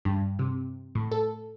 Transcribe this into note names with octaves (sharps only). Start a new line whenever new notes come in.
G2
C3
A2
A4